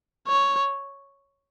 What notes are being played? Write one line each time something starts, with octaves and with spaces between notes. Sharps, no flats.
C#5